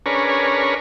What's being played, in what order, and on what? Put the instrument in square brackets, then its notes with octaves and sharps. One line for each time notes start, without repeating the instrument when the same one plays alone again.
[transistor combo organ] C#4 D4 G#4 A#4 B4 C#5